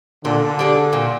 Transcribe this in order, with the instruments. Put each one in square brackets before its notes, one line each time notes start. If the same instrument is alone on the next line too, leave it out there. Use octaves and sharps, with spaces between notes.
[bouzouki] A#2 [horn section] D3
[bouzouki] G3 D4 G#4
A#2